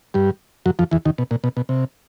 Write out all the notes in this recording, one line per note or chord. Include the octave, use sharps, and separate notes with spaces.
G2 G3
F#2 F#3
F2 F3
E2 E3
D#2 D#3
B2
A#2
B2
B2
C3